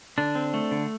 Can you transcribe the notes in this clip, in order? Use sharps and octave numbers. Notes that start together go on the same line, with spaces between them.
D3 D4
C4
A3
D3